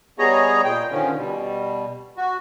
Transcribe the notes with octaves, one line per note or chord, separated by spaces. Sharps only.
G3 B3 G#4 C#5 D#5 A#5
A#2 G5
D3 D#3 F3 C#4
B2 G3
F#4